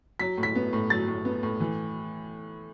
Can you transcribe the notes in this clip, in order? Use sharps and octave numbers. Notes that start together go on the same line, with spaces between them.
F#3 B6
A2
B6
B3
A2
F#3 A6
A2
B3
A2
E3